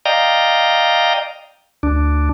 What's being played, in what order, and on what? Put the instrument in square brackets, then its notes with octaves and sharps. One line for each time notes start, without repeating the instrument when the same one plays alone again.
[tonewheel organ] D5 D#5 F5 G5 A#5
D2 D4